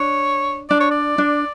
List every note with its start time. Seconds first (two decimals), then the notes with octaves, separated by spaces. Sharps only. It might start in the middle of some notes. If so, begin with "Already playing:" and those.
Already playing: D4 C#5
0.70 D4 D5
0.80 C#5
0.91 D5
1.18 D4